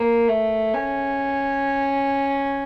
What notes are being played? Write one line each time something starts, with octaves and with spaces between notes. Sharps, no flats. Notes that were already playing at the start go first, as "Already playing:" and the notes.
Already playing: A#3
A3
C#4